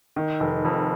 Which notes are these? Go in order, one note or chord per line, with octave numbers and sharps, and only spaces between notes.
D#3
F1
F2